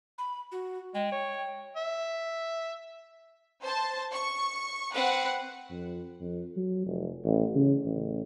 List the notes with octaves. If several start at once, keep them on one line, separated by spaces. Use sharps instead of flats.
B5
F#4
G#3 G5
C#5
E5
C5 A5
C#6
C4 B4 F#5
F2
F2
F#3
F1
A1
C#3
A1